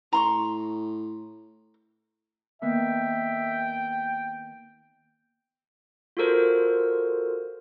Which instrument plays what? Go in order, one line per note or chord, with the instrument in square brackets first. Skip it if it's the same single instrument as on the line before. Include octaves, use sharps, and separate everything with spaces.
[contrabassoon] A2 [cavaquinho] A#5 C6 C#6
[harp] D#3 A#3 B3 [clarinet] E5 [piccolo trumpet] G5
[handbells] F4 F#4 A4 A#4 C5